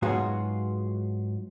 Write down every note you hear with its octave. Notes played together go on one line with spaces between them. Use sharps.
G#2 F#3 B3 F4 F#4 G#4